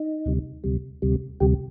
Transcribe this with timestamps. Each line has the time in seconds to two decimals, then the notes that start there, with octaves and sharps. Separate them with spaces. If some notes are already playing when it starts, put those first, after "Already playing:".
Already playing: D#4
0.25 D2 C3 G3
0.64 D2 C3 G3
1.02 D2 C3 G3
1.40 D2 C3 G3 G4